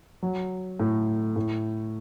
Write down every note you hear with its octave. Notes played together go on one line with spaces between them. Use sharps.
F#3
A2
A2